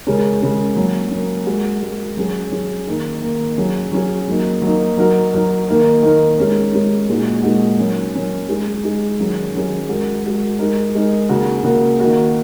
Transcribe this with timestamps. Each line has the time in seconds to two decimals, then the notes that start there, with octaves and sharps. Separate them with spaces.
0.07 C#3 G#3 C#4 A#4
0.41 C#3 G#3 C#4 A#4
0.76 F#3 A#3 C#4
1.11 F#3 A#3 C#4
1.47 G#3 F#4 A#4
1.81 G#3 F#4 A#4
2.17 F#3 C#4 G#4
2.52 F#3 C#4 G#4
2.87 D#3 A#3 D#4
3.22 D#3 A#3 D#4
3.58 F#3 C#4 G#4
3.92 F#3 C#4 G#4
4.28 F#3 A#3 D#4
4.62 F#3 A#3 D#4
4.97 F#3 D#4 F#4 A#4
5.33 F#3 D#4 F#4 A#4
5.68 D#3 A#3 D#4 A#4
6.03 D#3 A#3 D#4 A#4
6.38 G#3 C#4 A#4
6.73 G#3 C#4 A#4
7.08 A#2 G#3 D#4 F#4
7.43 A#2 G#3 D#4 F#4
7.78 F#3 C#4 A#4
8.14 F#3 C#4 A#4
8.49 G#3 D#4 G#4
8.83 G#3 D#4 G#4
9.19 D#3 F#3 C#4 G#4
9.54 D#3 F#3 C#4 G#4
9.89 G#3 F#4 A#4
10.24 G#3 F#4 A#4
10.59 G#3 D#4 A#4
10.95 G#3 D#4 A#4
11.29 C#3 A#3 F#4 A#4
11.64 C#3 A#3 F#4 A#4
12.00 D#3 A#3 F#4